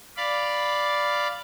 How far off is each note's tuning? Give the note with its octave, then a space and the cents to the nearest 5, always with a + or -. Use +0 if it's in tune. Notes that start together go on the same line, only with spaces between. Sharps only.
D5 +0 F5 +0 B5 +0